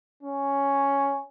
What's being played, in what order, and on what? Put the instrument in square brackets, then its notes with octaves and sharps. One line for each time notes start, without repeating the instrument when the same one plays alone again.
[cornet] C#4